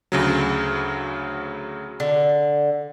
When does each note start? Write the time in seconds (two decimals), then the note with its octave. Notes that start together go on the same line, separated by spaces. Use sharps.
0.12 D2 C#3 F#3
2.00 D3